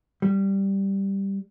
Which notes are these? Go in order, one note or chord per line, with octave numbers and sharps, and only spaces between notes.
G3